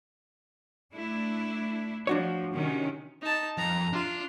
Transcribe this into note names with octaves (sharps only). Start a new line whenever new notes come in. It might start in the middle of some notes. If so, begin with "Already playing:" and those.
A3 D4 E4
F3 D4 F#4 C#5
C3 D#3 C#4
D#4 A5
F2 A#5
D4 F4